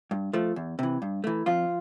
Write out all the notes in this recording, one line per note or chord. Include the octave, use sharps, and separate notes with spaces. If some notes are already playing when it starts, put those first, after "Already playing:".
G2
F3 A3
E2
C3 E3
G2
E3 A3
F2 F3 F4